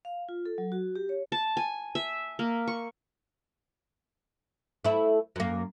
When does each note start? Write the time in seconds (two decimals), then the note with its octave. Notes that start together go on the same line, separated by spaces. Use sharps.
0.05 F5
0.29 F4
0.46 A4
0.58 F#3
0.72 F#4
0.96 G4
1.09 C#5
1.32 A5
1.57 G#5
1.95 E5
2.39 A#3
2.68 C#6
4.84 A3 E4
5.36 F#2 A#3